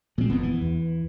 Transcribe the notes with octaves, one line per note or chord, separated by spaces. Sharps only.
A#2 F3 G#3 C4
D#1 F2 G#2 B3
E3
E2